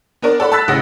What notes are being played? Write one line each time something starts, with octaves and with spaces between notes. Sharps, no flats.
B3 D4 A#4 D5
A4 D5 F#5 B5
A5 B5 E6 F#6 A6 B6
A1 C#3 F#5 A#6